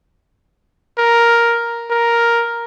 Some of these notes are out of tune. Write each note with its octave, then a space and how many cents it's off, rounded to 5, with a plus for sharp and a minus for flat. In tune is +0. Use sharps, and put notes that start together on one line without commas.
A#4 +5
A#4 +5